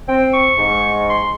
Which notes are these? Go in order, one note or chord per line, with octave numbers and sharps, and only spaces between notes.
C4 G5
C#6
G#2
C6